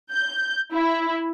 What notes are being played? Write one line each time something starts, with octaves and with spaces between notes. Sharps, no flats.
G6
E4